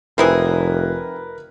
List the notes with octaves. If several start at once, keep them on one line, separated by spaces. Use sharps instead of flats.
F1 C4 E4 G#4 A#4 B4